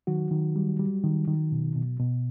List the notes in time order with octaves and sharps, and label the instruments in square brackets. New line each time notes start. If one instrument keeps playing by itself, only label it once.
[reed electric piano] D#3 F#3 F#4
D#3
G3
G3
D#3
D#3
B2
B2
B2